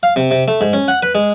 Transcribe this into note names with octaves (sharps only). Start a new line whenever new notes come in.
F5
C3
C3
A3
G#2
C#4
F#5
B4
G#3